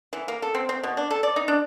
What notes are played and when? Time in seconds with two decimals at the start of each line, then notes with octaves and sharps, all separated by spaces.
0.13 E3
0.28 A#3
0.42 A4
0.55 C4
0.69 C4
0.83 B2
0.97 D4
1.11 A4
1.23 D5
1.36 D#4
1.48 D4